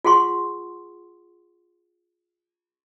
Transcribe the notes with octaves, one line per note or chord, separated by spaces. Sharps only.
F4 G#4 F#5 C6 C#6